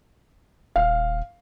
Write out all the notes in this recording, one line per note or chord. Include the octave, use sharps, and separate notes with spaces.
D#1 F5